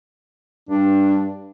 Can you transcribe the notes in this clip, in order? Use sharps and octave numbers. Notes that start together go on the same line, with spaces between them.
G2 D4